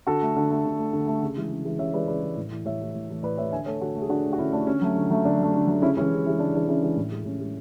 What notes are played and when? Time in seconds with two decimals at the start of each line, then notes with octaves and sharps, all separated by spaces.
0.07 D3 F#4 A4
0.22 A3
0.36 D3
0.51 A3
0.65 D3
0.79 A3
0.93 D3
1.07 A3
1.22 C#3
1.37 E3 G#3
1.51 C#3
1.65 E3 G#3
1.79 C#3 C#5 E5
1.94 E3 G#3 B4 D5
2.08 C#3 B4 D5
2.22 E3 G#3
2.37 A2
2.52 E3 A3
2.65 A2 C#5 E5
2.80 E3 A3
2.95 A2
3.09 E3 A3
3.23 A2 B4 D5
3.38 E3 A3 C#5 E5
3.52 D3 E5 G#5
3.66 A3 A4 C#5
3.81 D3 F#4 A4
3.95 A3
4.02 G#4
4.09 D3 D4 F#4
4.25 A3
4.33 F#4
4.38 D3 C#4 E4
4.52 A3 D4
4.67 D3 C#4
4.82 F#3 A3
4.95 D3
5.10 F#3 A3
5.25 D3 D4
5.39 F#3 A3
5.54 D3
5.67 F#3 A3
5.82 C#3 C#4 E4
5.97 E3 G#3 C#4 E4
6.11 C#3
6.25 E3 G#3
6.39 C#3 D4
6.54 E3 G#3 D4
6.68 C#3 C#4 E4
6.83 E3 G#3
6.97 A2
7.11 G#3
7.25 A2 C#4
7.40 G#3